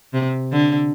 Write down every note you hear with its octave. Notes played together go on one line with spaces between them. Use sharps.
C3
D3